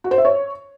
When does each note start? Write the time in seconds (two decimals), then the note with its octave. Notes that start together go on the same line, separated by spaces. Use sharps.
0.04 F#4
0.11 C5
0.18 E5
0.25 C#5